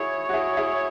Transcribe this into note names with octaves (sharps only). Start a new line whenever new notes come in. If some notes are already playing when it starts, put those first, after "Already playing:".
Already playing: E4 F#4 G#4 C#5
F#4
E4 G#4
E4 G#4